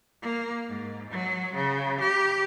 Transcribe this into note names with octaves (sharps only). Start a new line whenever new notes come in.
A#3
G#2
F#3
C#3
G4